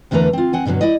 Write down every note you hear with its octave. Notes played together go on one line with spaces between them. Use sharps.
E2 D3 A3 A#4 B4 A#5
C4 F4
C4 F#5 G#5
G2 B2 D3 E3 F#3
E4 D5 D#5